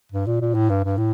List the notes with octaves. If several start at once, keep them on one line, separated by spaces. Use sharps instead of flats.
G2
A#2
A#2
A2
G2
G2
A2